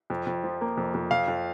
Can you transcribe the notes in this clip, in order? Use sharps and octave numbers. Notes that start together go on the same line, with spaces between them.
F2
F2
F3
A#3
F2
F2
F2 F5
F2